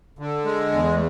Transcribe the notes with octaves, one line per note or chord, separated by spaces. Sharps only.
D3
G#3
E2